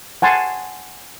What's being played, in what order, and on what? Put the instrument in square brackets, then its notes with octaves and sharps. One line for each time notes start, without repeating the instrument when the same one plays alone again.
[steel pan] F#5 G#5 A5 C6